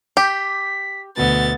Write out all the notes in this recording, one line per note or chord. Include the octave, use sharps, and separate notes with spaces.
G4 G6 B6
D2 B2 B3 A6